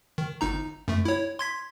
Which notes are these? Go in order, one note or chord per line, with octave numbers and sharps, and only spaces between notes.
D#3
G1 D#4 A#5
F#2 A3
E4 C#5
C6 G#6 B6